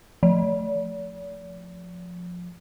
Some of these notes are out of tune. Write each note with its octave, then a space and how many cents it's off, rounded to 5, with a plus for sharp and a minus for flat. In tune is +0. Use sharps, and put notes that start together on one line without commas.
F3 +20